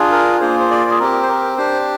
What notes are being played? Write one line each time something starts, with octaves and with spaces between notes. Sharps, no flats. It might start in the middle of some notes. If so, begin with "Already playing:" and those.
Already playing: D4 F4 G#4
A#4
A#3 F4 G#4 C5
C5
D5
G#4
C4 G4 A#4
C5
A#4
D4 G4 C5